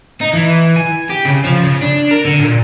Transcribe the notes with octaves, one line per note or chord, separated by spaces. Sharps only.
D#4
E3
G#5
G4
C#3
F3
C#3
D4
A#4
D3
A#2